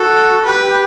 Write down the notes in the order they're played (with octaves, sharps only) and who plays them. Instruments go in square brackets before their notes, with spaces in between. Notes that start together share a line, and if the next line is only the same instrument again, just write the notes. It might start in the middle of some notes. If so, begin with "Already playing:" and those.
Already playing: [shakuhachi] F#4 [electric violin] A4
[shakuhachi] G4 [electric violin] B4